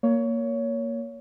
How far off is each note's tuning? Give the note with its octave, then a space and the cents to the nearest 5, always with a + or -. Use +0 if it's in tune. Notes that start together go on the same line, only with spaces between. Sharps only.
A#3 +0 C#5 +20